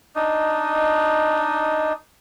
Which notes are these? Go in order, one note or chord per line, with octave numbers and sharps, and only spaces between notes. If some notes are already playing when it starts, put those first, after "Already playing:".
D4 D#4 D#5